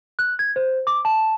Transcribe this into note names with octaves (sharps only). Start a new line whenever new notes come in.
F#6
G#6
C5
D6
A5